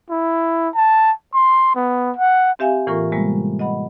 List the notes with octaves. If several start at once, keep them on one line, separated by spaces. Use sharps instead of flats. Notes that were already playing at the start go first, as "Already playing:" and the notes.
E4
A5
C6
B3
F#5
C4 G4 E5 F5 G#5
A2 E3 A#3 F4 A#4 C#6
C3 G3 G#3 A#3 B3
D#5 F#5 B5